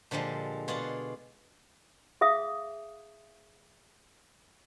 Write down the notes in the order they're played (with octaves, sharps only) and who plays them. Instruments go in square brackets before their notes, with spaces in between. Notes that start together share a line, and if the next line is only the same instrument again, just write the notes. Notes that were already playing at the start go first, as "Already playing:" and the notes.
[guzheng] A#2 D3 F3 G3 G#3
B2 F4 G#4 D5 F#5
[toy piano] G#4 E5 F5 D#6